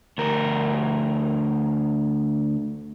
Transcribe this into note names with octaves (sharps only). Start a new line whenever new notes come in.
D2 A#4